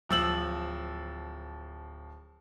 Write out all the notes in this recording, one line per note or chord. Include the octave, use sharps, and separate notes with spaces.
D1 F3 E6 F#7